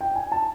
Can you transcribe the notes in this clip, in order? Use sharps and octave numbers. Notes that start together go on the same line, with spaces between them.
G5
G#5
A5